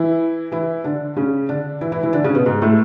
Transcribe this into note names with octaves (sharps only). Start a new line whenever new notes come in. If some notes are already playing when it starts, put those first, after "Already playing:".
Already playing: E3 E4
E3 E4
D3 D4
C#3 C#4
D3 D4
E3 E4
E3 E4
E3 E4
D3 D4
C#3 C#4
B2 B3
G#2 G#3
A2 A3